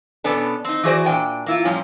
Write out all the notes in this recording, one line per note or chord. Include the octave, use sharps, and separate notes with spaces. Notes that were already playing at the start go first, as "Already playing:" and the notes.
B2 B3 C#4 D4 A4
C4 D#4
E3 F#4 G#4 C5 D5
A#2 D4 G5 G#5
A#3 E4 F4
A#2 F3 G3 C#4